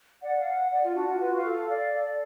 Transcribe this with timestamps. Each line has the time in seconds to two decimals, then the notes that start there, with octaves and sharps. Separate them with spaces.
0.22 D5 F#5
0.39 F5
0.46 F#5
0.71 D5 F#5
0.83 F4
0.95 D4 F#4
1.08 F4
1.20 F4 B4
1.36 F5
1.44 A4
1.52 F5
1.69 D5 F5
1.93 A4